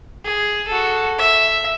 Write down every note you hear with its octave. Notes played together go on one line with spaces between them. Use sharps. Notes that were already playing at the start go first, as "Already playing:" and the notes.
G#4
F#4 A4
E5